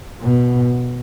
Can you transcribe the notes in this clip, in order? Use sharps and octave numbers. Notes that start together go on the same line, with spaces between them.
B2